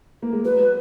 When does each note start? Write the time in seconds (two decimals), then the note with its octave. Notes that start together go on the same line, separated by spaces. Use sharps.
0.22 A#3
0.33 G#3
0.45 F#3 B4